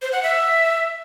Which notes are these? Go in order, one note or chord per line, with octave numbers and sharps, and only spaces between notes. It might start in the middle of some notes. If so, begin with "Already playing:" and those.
C5
F#5
E5